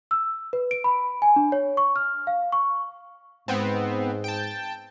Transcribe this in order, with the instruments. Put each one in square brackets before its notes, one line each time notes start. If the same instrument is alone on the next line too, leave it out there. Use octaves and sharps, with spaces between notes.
[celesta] E6
B4
D7
B5
G#5
D4
C#5
C#6
F6
F5
C#6
[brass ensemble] G#2 [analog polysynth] B3 C4
[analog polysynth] G5 A5